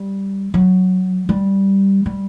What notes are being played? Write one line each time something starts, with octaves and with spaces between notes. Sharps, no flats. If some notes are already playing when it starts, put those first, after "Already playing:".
Already playing: G3
F#3
G3
G3